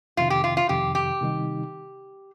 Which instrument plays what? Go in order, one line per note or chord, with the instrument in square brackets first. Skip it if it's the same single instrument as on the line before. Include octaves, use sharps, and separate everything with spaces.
[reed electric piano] F2 C3 D#3 [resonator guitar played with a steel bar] F4
[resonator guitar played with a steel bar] G4
F4
F4
[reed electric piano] F2 C3 D#3 [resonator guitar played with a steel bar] G4
[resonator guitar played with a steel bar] G4
[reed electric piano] C3 D#3 G3 D#4